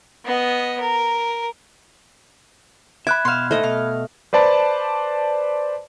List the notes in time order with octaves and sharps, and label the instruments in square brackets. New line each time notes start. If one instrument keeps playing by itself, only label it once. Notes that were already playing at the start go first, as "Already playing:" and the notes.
[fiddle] B3 D#5
A#4
[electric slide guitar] E5 [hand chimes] B5 F#6 G#6 [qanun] D6
[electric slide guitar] B2 E5 [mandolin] F5 C6
[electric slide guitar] A#2 D#4 C5 [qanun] A3 D#5
[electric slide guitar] B2 [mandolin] F5
[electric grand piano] B4 C5 D5 A5 B5